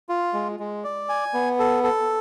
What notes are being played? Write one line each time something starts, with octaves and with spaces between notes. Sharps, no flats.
F4
G#3
G#3
D5
G#5
B3
A4
A4